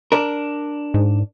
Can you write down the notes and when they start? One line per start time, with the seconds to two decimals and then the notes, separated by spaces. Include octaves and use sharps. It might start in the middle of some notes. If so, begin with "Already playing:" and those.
0.12 D4 A#4
0.94 G#2